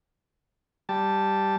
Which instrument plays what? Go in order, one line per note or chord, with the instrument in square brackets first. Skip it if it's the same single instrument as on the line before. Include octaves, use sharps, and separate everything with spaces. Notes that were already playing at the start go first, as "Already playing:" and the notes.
[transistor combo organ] G3 A5